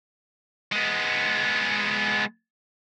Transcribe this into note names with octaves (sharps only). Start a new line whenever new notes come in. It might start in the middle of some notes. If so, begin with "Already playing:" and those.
G#3 B3